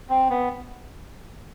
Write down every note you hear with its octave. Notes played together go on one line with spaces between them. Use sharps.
C4
B3